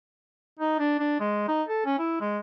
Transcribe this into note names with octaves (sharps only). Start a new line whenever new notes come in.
D#4
D4
D4
G#3
D#4
A4
C#4
E4
G#3